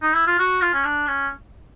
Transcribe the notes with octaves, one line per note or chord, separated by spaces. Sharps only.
D#4
E4
F4
F#4
F4
C#4
D4
C#4